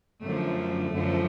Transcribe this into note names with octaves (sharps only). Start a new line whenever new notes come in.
F#2 D3 F3 A3
F#2 D3 F3